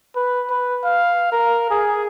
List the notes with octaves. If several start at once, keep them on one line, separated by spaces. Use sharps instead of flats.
B4
B4
F5
A#4
G#4